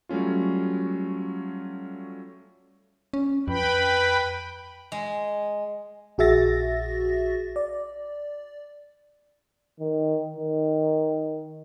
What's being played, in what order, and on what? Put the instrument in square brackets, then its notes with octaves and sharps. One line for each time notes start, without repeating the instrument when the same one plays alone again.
[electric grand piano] F#3 G3 A3 C#4 F4
[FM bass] C#4
[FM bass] F2 [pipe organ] B4 G5 B5
[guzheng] G#3
[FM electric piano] A#1 F#4 G#4 E5 A6 A#6
D5
[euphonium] D#3
D#3